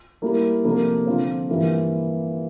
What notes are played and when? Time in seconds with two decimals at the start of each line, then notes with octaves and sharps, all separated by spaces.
0.22 G3 A#3 E4
0.64 C3 F3 A#3 D4 A4
1.06 D3 F3 C4 F4 C5
1.49 G2 E3 A#3 F4